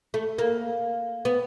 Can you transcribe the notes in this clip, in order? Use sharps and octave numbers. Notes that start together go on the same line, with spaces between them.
A3
A#3
B3